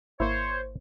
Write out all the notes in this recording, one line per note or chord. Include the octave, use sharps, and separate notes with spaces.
G#1 A#3 E4 C5 C#5